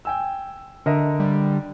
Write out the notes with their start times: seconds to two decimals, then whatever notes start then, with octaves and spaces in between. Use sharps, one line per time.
0.05 G5 G#5 E6
0.86 D3 A#4 D#5 E5
1.19 G3